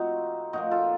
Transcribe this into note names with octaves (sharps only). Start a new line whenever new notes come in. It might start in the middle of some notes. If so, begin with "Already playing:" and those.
Already playing: A2 F3 A3 C4 D#4 F#4
A#2 F3 A#3 D#4 F#4
F4 A4